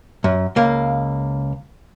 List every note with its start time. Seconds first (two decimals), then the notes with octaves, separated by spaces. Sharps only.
0.24 F#2
0.56 C#2 A#3